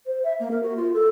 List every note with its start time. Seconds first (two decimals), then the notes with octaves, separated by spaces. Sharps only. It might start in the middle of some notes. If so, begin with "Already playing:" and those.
0.06 C5
0.23 E5
0.39 A#3
0.51 A#4
0.62 F#4
0.76 F4
0.94 A4